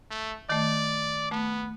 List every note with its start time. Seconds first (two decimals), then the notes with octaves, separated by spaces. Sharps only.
0.10 A3
0.49 D#3 A3 D5
1.31 A3 B3